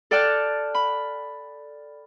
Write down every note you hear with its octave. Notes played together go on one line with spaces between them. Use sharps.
A4 D5 G5 A5 F6 F#6
B5